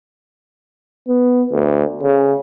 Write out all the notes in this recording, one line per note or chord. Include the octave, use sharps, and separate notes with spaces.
B3
D2
C#3